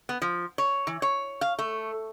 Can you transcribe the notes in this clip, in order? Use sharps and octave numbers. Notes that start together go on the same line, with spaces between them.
B3
F3
C#5
E3
C#5
F5
A3